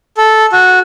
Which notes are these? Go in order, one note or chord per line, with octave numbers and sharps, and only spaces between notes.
A4
F#4